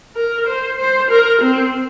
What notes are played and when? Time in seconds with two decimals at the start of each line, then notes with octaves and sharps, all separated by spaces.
0.16 A#4
0.47 C5
0.78 C5
1.10 A#4
1.41 C4